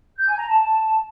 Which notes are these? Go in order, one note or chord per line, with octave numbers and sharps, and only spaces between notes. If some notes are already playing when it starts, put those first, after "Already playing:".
G6
G#5
A#5
A5